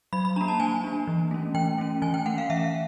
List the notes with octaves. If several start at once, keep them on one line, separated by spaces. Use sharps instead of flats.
F#3 B5
B5
A#3 D4 A#5
A5
F#3 G#5
A#3 D4
E3
A3 C#4
E3 G5
A3 C#4
E3 G#5
G5
A3 C#4 F#5
F5
E3 E5